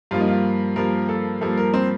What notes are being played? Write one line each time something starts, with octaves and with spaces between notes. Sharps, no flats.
G2 F3 A#3 F4
D#4
F4
G2 F3 A#3 A#4
A4
G2 F3 A#3 A4
A#4
C4